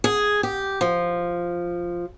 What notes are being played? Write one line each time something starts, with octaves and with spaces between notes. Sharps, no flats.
G#4
G4
F3